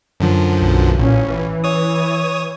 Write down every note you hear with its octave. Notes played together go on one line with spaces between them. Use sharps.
F#2 D3 F3
B1
A1 A#2 C#4
E3
C#5 D#6